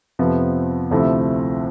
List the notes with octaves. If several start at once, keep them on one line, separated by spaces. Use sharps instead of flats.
F2 C3 F3 B3
D2 C3 F3 A3 E4